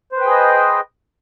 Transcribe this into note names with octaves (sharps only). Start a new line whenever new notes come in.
G#4 B4 C5 D#5 G5